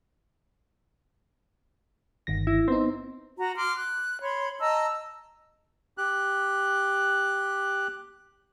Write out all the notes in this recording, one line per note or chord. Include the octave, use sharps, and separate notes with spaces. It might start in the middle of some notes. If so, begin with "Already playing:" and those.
G1 D#3 A#6
E4
B3 C4 D#4
F#4 A#5
C6 D6 F6
F#6
C#5 B5 C6
D#5 A5 A#5 E6
G4 F#6